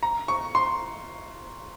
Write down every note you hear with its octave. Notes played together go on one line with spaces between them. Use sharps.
A#5
C#6
C6